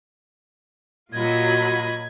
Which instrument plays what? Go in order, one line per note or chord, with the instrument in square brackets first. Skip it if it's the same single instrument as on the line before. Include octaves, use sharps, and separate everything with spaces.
[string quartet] A#2 D#5 B5 [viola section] F#3 F4 [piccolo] G#6